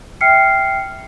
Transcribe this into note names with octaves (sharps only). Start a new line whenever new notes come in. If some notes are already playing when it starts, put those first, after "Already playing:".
E5 G5 F6 C7 C#7